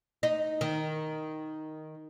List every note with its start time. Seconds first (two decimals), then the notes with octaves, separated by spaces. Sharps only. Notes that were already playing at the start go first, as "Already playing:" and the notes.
0.23 D#4
0.61 D#3